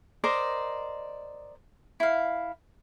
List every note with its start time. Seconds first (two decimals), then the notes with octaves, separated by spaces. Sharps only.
0.24 A#4 C5 D5 D#5
2.00 E4 F5